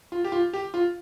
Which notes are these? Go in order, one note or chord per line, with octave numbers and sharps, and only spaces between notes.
F4
G4
F4
G4
F4